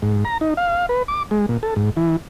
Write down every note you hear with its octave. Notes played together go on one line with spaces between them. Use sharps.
G#2
A#5
D#4
F5
B4
D6
G#3
A#2
A4
G#2
E3